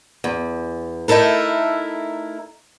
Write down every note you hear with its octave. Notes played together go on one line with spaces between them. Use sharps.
E2
A3 D#4 E4 A4 A#4